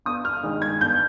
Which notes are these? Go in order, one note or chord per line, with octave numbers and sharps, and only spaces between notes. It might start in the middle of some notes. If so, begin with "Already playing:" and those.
G1 D#6
F6
G2 D#3 G#3
G#6
G1 G6